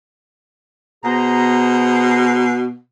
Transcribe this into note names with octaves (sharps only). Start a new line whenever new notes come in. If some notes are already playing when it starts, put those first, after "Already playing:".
B2 G#4 C5 A#5